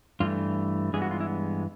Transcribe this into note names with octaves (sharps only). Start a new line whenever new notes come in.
G2 E3 A3 F4
G2 E3 G#3 B3 G#4
F#4
F4
E4